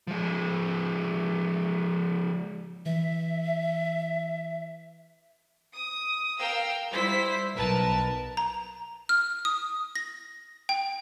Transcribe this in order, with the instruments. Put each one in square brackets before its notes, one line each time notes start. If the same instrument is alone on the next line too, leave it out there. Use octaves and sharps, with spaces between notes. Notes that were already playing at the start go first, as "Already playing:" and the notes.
[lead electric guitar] F3 G#3
[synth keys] E3 [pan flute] E5
[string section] D#6
A#4 F5 G5 E6
G3 E4 C5 B6
B1 A#4 B4 A5
[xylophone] A#5
F6
D#6
A#6
G5